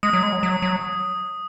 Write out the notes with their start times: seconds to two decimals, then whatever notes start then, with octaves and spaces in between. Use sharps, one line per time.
0.03 G#3 D#6
0.13 F#3
0.23 G#3 D#6
0.32 F#3
0.43 F#3 D#6
0.62 F#3 D#6